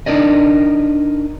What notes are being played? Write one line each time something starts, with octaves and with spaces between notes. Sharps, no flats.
D4 D#4 A#4 D5 D#5